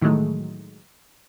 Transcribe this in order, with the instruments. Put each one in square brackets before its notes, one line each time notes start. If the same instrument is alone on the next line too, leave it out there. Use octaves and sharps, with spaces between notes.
[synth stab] A2 D#3 E3 F#3 G#3 A3